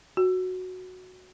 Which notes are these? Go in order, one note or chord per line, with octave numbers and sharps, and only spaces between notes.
F#4